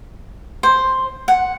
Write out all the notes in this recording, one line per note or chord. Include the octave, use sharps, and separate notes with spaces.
C5
F#5